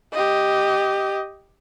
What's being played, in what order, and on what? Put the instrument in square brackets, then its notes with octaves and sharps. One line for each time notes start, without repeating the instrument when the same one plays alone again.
[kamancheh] G4 D#5